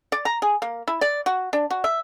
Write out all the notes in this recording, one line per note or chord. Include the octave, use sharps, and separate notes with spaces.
D5
A#5
G#4
A#3
E4
D5
F#4
D4
F#4
E5